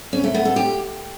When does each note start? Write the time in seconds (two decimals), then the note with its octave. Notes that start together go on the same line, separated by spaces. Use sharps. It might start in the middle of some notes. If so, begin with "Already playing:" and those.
0.13 C#4
0.24 A3
0.34 B3
0.45 A4
0.56 G4